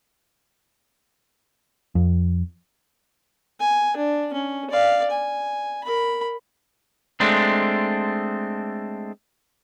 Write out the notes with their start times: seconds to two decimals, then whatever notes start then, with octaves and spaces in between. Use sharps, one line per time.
1.95 F2
3.60 G#5
3.97 D4
4.33 C#4
4.71 D5 F5
5.11 G#5
5.84 A#4 B5
7.20 G#3 A3 C4 D4